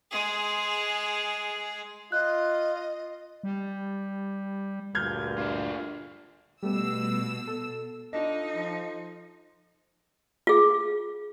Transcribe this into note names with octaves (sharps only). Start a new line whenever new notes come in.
G#3 G#4
F4 D#5 F#6
G3
D2 G2 A#2 F6 G6 G#6
D4 F4
B2 G3 A3 B3 E6
A4
D4 D#4 F4 A4 D#5
F3
F4 G#4